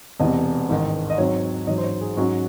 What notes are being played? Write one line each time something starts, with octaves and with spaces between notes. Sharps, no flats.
E1 E2 C3 D#5
A1 G#2 D#3
D#5
G#2 F#3 C4 C#5
A1 G#2 F#3 D#5
C5
C#5
G#4
G#2 F#3 C#4 F#4